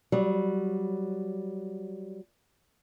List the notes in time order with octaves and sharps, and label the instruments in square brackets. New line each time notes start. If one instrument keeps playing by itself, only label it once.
[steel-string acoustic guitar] F#3 G3